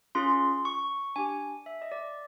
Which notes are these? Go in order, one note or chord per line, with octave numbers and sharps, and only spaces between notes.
C#4 F4 G#4 C6
C#6
D4 G4 G#5
E5
D#5
D5